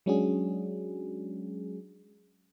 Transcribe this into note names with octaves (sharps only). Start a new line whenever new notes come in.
F#3 G#3 C#4 D4 F#4 G#4